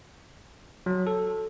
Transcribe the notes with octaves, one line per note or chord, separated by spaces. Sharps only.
F#3
A4